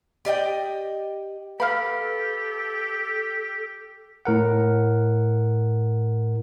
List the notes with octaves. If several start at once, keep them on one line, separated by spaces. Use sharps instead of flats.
G4 D5 D#5 G5
G4 A4 B4 F5 B5 F6
A2 A#4 F#5